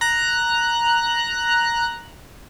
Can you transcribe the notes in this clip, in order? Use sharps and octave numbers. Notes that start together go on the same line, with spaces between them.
A#5 F#6